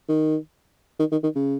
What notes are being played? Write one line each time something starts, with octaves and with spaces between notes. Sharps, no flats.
D#3
D#3
D#3
D#3
C#3